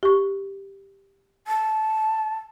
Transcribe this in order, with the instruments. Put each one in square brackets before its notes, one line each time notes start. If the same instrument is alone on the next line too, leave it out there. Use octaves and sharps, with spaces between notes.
[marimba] G4 C#6
[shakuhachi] A5